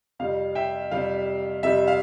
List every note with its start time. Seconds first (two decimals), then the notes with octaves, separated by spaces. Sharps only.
0.19 F2 C3 G3 F5
0.55 E5 G5
0.91 F2 C3 G3 F5
1.63 F2 C3 G3 E5
1.88 F5